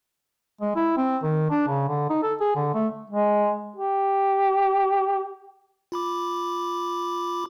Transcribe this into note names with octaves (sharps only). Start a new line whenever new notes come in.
G#3
E4
C4
D#3
D4
C#3
D3
D#4
A4
G#4
D3
A3
G#3
G4
F4 B5 D6